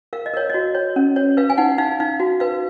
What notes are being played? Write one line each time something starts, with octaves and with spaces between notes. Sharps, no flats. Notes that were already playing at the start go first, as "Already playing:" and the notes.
A#4 F5
D#5
A#4 C#5
F#4 D#5
C#5
C#4
C#5
B4 F5
G#5
D#4 F#5
D#4 F5
D#4 F5
F#4
B4 F5